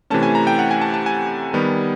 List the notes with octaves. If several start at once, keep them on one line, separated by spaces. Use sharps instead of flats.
C3 E3 A3 C#4 A5
G#5
A#5
G5
F#5
G#5
A5
A5
G#5
D#3 G3 B3